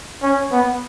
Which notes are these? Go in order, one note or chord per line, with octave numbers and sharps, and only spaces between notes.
C#4
B3